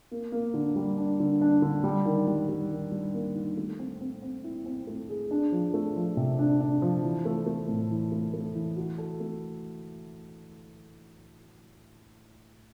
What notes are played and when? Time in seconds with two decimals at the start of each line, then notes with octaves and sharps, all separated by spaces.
0.11 A#3
0.32 A#3
0.54 D3
0.76 G3
0.97 D4
1.20 D3
1.41 D4
1.62 D3
1.84 G3
2.06 D#3
2.27 G3
2.49 G3
2.71 D#3
2.92 G3
3.14 A#3
3.35 D#3
3.57 A3
3.79 C4
4.01 C4
4.22 C4
4.44 E4
4.66 C4
4.87 A3
5.09 G#4
5.31 D4
5.52 F3
5.74 A3
5.96 F3
6.17 C3
6.39 D4
6.60 D4
6.82 F3
7.03 E3
7.25 A3
7.46 A3
7.68 A2
7.91 E3
8.12 A3
8.33 A3
8.55 E3
8.76 F#4
8.98 A4
9.20 A3